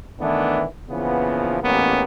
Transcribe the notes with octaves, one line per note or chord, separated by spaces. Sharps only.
D#3 E3 A3 B3 D4 E4
A#1 C#3 E3 F3 B3
A1 G#2 A#3 B3 C#4 G4